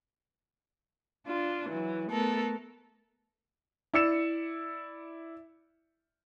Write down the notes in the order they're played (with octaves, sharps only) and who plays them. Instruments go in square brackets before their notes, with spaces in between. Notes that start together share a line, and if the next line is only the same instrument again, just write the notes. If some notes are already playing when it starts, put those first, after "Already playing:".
[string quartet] D4 F4
E3 F#3
A3 B3 A4 A#4
[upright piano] E4 D5 E6 C#7 E7